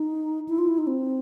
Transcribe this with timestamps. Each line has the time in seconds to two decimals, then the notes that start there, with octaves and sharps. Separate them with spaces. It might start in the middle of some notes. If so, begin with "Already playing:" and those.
Already playing: D#4
0.49 E4
0.58 F4
0.68 E4
0.78 D#4
0.87 C4